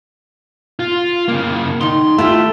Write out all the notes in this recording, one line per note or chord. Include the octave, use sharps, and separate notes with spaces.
F4
C#3 A#3
D#3 D#4 C6
A3 E4 F4 G4